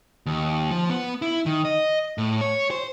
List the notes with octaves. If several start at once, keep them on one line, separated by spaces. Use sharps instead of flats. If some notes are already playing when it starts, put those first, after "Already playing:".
D#2
F3
B3
E4
D#3
D#5
A2
C#5
C5